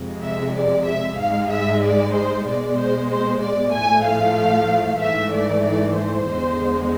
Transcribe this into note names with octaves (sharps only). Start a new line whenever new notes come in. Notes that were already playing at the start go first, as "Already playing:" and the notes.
Already playing: F2 C3 G#3
E5
D5
E5
G#2 G#3 F5
E5
D5
C5
B2 G#3 D5
C5
C5
D5
A2 F3 A3 G#5
F5
G#2 E3 A3 E5
D5
D5
C5
E2 D3 G#3